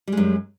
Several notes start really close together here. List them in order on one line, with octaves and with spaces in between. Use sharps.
G3 G#3 F#2